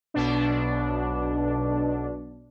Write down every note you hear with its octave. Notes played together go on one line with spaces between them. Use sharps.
B1 B2 D4